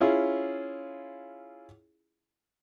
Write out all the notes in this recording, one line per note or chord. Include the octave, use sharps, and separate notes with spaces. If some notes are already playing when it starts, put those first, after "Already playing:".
C#4 E4 F4 G#4